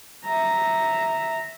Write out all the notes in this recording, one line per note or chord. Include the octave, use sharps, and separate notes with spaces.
E5 A#5